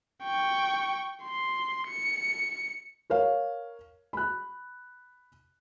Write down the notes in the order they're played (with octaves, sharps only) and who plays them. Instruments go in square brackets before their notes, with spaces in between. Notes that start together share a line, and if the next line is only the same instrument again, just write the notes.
[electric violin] G5 C#6
C6
C#7
[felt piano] A#4 C#5 F5
B5 F#6